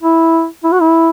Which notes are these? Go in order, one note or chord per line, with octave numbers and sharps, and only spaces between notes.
E4
E4
F#4
E4